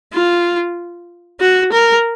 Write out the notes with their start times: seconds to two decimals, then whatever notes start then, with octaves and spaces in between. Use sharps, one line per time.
0.13 F4
1.40 F#4
1.72 A#4